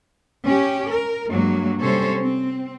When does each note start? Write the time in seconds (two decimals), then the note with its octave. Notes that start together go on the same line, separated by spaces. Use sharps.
0.46 C#4 G4
0.89 A#4
1.31 G2 F#3 G#3 A#3
1.81 C3 G3 C#4 A4 C5 C#5
2.22 C4